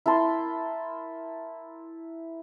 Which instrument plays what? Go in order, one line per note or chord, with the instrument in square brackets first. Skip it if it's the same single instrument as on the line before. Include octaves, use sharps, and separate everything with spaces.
[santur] E4 A#4 A5 C6